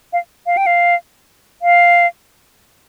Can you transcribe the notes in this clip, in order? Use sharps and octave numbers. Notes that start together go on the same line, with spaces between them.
F5
F5
G5
F5
F5